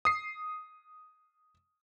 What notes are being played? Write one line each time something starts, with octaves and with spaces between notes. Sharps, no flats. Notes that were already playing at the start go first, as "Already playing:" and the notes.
D#6 C7